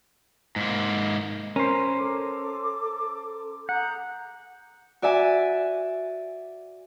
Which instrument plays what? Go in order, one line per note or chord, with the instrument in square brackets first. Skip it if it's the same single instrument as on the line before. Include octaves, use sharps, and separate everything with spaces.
[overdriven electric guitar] G#2 A#3
[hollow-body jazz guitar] C#4 [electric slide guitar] A#4 C5
[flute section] A4 D6
[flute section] G#4 A#5 G6 [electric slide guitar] F#5
[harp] F#4 D5 E5 G#5